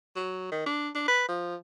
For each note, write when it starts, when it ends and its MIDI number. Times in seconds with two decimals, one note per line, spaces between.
0.16 0.51 54
0.52 0.65 51
0.66 0.89 62
0.95 1.06 62
1.08 1.25 71
1.29 1.55 53